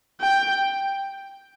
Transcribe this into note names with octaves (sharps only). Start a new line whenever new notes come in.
G5